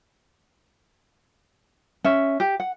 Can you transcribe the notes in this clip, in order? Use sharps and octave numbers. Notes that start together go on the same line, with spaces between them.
C#4 E5
G4
F#5